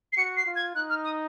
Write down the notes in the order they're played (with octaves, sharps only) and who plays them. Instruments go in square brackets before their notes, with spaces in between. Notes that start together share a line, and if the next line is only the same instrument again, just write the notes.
[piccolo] C7
[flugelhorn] F#4 [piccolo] C#7
[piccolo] C7
[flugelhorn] F4
[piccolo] G#6
[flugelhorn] D#4 [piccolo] F#6
[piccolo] F6
D#6